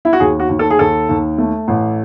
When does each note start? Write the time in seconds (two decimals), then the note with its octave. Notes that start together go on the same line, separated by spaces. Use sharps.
0.05 E4
0.13 F#4
0.20 D#2 G#4
0.40 F#4
0.49 D#2
0.59 A4
0.70 G#4
0.79 D#2 A4
1.09 D#2
1.38 A3
1.68 A1